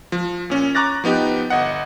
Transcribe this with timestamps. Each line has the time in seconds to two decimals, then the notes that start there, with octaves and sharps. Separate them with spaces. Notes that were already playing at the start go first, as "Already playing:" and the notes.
0.12 F3
0.50 A#2 C#4
0.75 A#5 C#6 D6 F#6 A6 A#6
1.04 F3 B3 D#4 G4
1.50 G1 D#5 F#5